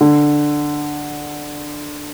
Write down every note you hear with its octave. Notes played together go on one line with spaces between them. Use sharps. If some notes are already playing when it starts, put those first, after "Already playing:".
D3